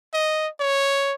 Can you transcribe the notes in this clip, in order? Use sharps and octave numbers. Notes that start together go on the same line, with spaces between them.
D#5
C#5